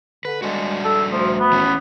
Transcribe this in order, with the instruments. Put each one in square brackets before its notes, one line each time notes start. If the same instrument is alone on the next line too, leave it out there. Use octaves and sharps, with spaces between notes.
[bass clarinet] D3 [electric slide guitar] B4
[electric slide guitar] G3 D4 F#4 [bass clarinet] G#3
[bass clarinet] A4
[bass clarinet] D2 [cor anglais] F3
[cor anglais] B3
[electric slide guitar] E3 C#4